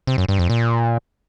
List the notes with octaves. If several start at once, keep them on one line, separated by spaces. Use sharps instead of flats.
C3
F#2
G2
F2
A#2